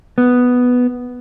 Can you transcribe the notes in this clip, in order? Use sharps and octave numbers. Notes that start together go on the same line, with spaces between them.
B3